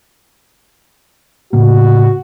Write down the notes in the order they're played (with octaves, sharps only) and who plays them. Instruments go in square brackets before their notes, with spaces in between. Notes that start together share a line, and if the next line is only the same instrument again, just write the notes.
[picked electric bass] A2 C#3 A#3 [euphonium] F#4